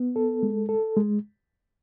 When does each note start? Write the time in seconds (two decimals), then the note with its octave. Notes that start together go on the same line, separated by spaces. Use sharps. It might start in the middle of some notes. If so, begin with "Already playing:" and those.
Already playing: B3
0.16 A4
0.43 G#3
0.69 A4
0.96 G#3